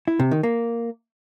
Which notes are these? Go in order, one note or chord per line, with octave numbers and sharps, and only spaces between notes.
E4
C3
D#3
A#3